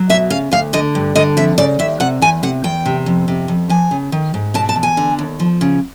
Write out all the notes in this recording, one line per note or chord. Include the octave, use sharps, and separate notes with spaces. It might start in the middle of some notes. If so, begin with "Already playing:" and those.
Already playing: F#3
B2 E5
C#3 F5
D2 F5
D3 D#5
G2
D3 D#5
F2 E5
C#3 D5
D#2 E5
C3 F#5
E2 G#5
C3 F#5
E2 G5
C3
F2
C3
F2
F3 G#5
C#3
D#3
G#2
B2 A5
A5
E2
G#5
D3
D#2
F3
C#3